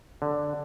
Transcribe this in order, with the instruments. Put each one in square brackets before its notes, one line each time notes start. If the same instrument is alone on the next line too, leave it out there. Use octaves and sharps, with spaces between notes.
[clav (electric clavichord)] D3